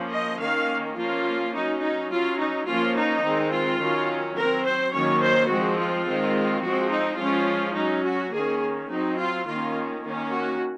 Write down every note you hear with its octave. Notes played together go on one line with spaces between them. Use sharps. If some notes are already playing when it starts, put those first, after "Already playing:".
Already playing: F3 A#3 C#4
D#5
D#3 A#3 C#4 F5
F3 A#3 C#4 F4
F#3 C#4 D#4
D#4
F#3 C#4 F4
D#4
F3 A#3 C#4 F4
D#4
D#3 G#3 C4
F4
D#3 F#3 C#4
F#3 C4 A#4
C5
D#3 F#3 A#3 C#4 C#5
C5
F3 G#3 C4 F#4
F4
D#3 G#3 C4
F3 G#3 C4 F#4
D#4
F3 G#3 C#4 F4
F#3 C#4 D#4
F#4
D#3 A#3 C#4 G#4
F#3 C4 D#4
F4
D#3 A#3 C#4 F4
D#3 A#3 C#4
F#4